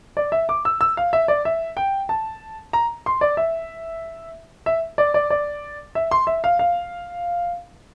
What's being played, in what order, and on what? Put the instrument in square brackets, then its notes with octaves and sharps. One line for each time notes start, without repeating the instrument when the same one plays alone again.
[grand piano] D5
E5
D6
E6
E6
F5
E5
D5
E5
G5
A5
A#5
C6
D5
E5
E5
D5
D5
D5
E5
C6
E5
F5
F5